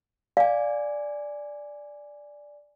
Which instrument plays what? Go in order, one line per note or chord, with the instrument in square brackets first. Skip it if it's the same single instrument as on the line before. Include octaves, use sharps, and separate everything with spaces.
[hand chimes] D5 G#5 [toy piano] F5